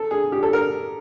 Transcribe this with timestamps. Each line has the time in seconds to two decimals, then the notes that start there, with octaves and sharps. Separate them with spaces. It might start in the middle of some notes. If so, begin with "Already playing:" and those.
Already playing: A4
0.11 G#4
0.32 G4
0.43 A4
0.53 A#4